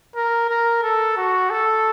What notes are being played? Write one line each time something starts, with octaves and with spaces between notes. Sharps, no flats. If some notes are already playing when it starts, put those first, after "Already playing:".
A#4
A#4
A4
F#4
A4